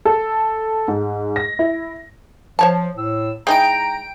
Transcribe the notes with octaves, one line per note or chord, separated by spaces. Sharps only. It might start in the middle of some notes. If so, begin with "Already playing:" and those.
A4
G#2
A#6
E4
F3 C5 C#5 A5
A2 E6
G#3 D#4 E4 G5 A#5 D7